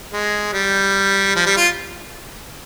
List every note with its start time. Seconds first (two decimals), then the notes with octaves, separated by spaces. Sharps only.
0.11 G#3
0.53 G3
1.36 F3
1.46 G3
1.57 F4